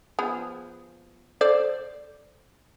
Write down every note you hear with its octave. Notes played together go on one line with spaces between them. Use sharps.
F3 B3 G#4
A4 C5 D5